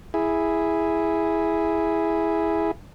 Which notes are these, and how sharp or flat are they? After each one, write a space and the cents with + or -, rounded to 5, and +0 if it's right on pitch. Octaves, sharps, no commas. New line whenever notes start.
E4 +0 G#4 +0